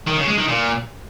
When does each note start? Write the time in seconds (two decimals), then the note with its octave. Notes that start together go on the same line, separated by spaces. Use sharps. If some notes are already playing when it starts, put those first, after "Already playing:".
0.07 D#3
0.17 C#3
0.27 G#3
0.38 D#3
0.48 A#2